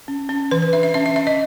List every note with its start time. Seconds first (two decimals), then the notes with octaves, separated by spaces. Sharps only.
0.08 C#4
0.29 C#4
0.51 E3 B4
0.62 B4
0.73 D4 E5
0.83 E5
0.94 C#4 E5
1.06 E5
1.16 C#4 E5
1.27 D#5